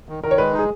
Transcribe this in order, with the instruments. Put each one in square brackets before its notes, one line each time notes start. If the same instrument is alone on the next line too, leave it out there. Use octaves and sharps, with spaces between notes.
[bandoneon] D#3
[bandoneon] D#3 [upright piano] A#4
[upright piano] C#5
[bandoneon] G#3 [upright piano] B4
[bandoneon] D#4 [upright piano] G#4